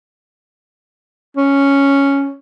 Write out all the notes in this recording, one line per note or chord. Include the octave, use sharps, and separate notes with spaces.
C#4